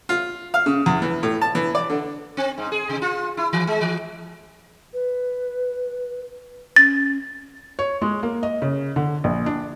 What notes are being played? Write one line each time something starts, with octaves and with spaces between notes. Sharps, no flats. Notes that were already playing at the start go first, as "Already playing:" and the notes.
F4
F5
C#3
E2
E3
A2
A5
E3
D5
D3
C4
G#2
G#4
C3
F4
E4
E3
G#3
E3
B4
C#4 A6
C#5
G#3
A#3
D#5
C#3
D3
A#1
D4